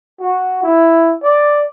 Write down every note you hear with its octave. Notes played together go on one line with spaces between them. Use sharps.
F#4
E4
D5